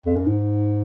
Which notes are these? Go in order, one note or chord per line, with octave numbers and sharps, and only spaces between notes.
F2
F#2
G#2